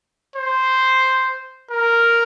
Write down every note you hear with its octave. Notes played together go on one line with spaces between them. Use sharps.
C5
A#4